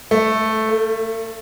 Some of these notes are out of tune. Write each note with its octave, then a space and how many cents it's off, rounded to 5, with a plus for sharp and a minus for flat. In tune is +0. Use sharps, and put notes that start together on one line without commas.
A3 -5
A3 +40